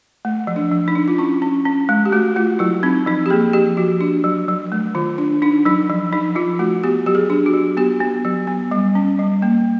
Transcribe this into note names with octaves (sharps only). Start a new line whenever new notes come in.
A3
F3
D4
F3
D#4
D4
F4
C#4 E4
C#4
C#4
G#3
G4
A3 F#4
A3 F4
F#3 E4
C4 D#4
F3 D#4
G4
A#3 G#4
F3 G4
F3 F#4
D4
F#3
F#3
A3
D#3 F4
D4
D4 D#4
F#3 D#4
F3
F3 D#4
F3 F4
A3 F#4
B3 G4
F#3 G4
G#4
D4
F#4
F#3
B3 G4
B3
F#3
B3
G3
C#4
G3
A#3